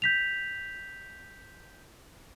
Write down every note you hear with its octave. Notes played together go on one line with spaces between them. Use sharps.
G6 B6 F7